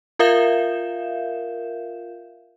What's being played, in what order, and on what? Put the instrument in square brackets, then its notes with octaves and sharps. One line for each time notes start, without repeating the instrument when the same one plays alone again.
[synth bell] F4 A#4 E5 F5 G6 E7